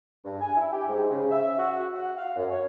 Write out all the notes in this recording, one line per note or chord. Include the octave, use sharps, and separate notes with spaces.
G2
G#5
E4
G4
G#2
C#3
E5
F#4
F#5
F5
F#2
C#5